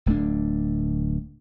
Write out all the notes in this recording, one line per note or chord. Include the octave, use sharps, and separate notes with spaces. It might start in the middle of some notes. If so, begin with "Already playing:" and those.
D1 A3 D4